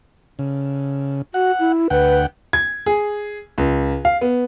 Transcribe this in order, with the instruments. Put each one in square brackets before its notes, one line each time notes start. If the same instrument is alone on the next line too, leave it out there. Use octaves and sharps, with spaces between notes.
[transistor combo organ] C#3
[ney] F#4 [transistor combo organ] F#5
[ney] E4
[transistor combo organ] D2 F#5 G5 [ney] B4
[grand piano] G#6
G#4
C#2
F5
B3